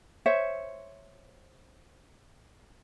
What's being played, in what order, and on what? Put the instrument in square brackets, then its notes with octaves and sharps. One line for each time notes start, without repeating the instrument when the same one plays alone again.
[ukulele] C5 C#5 E5